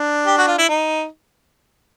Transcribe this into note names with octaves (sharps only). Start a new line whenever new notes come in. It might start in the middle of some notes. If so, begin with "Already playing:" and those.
Already playing: D4
G4
F#4
F4
E4
D#4